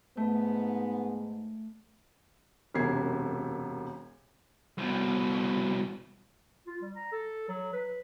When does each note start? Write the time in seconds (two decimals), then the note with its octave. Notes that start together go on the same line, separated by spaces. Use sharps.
0.17 G#2 A3 B3
2.75 E1 F#2 C3 G#6 C7
4.78 C2 B2
6.67 F4
6.82 G3
6.96 A#5
7.12 A4
7.49 F#3
7.73 B4